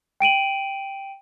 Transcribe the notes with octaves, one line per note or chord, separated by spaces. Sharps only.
G5 D7 D#7 F#7